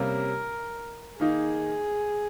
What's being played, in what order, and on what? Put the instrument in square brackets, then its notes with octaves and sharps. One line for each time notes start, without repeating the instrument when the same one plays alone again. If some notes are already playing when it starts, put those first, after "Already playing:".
Already playing: [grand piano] C3 G3 A#3 C#4 [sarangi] A#4
[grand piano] D#3 A#3 D#4 [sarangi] G#4